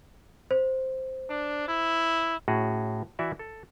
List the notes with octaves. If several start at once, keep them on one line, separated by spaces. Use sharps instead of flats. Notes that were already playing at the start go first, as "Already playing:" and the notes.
C5
D4
E4
A2 C#4 F#4 G#4
E3 E4 F#4 D5 E5
A4